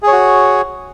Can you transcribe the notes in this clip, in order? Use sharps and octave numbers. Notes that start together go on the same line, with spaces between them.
F#4 G#4 C#5